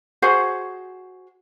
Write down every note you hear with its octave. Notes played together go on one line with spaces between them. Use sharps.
F#4 G#4 C5 F#5